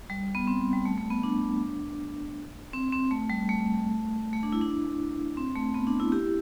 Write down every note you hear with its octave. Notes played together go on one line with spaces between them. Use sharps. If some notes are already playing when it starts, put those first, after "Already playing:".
G3
B3
C4
G3
A3
A3
B3
D4
C4
C4
A3
G3
A3
A3
D4
E4
D4
C4
A3
B3
D4
E4
E4 G4